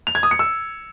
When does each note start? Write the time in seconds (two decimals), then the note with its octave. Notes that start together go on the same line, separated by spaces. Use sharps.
0.07 F7
0.15 G#6
0.23 D#6
0.31 C#7
0.39 E6